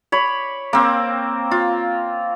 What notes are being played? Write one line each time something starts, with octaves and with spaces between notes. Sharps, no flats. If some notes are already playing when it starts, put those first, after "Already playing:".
C#5 B5 D6
A#3 C4
F4